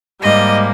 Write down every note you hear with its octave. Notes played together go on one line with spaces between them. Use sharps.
G#2 G3 A#3 D#5